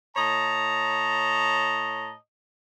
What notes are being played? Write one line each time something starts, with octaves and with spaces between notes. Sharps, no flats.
A2 C#5 D#5 A5 A#5